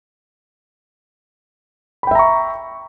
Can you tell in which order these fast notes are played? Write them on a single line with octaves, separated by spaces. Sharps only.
B5 G5 E5 A#5 C#6